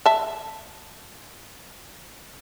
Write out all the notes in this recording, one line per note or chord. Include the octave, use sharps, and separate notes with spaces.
E5 A5